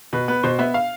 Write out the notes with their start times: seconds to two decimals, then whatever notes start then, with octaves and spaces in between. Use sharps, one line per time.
0.13 B2 B4
0.28 B3 B4
0.43 B2 C5
0.59 B3 E5
0.74 F5